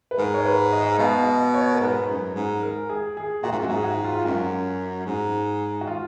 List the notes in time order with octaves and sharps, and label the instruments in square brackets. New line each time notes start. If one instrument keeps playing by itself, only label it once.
[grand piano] B4
[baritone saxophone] G#2 [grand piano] A#4
[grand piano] C#5
B4
D#5
D#5
[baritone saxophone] B2 [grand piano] F5
[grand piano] D#5
C#5
A#4
[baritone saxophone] G#2 [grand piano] B4
[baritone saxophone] F#2
G#2
[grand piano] A#4
G#4
G#4
[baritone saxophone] A#2 [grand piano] F#4
[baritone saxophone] G#2
F#2
[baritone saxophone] G#2 [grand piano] F#4
[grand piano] G#4
F#4
F4
F4
[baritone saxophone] F#2 [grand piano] F#4
[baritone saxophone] G#2
[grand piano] F#4
F4